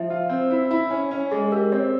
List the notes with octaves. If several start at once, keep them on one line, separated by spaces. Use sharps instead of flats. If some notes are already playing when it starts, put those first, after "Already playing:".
Already playing: F3 E5
F4
C4
E4
E4
C#4
C#4
G#3 G#4
G4 A#4
C4 C#5